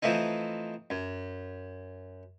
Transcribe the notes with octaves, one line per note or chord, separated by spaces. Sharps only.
E3 F3 A3 C4 D#4
F#2